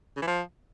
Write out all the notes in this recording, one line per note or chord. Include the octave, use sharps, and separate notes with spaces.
C#3
E3
F3